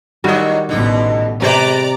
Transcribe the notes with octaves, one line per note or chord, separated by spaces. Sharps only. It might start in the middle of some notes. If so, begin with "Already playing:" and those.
A2 D#3 F#3 G3 F#4 D#5
A1 B2 D3 D#4
C3 G#3 B4 C5 D5 A#5 D6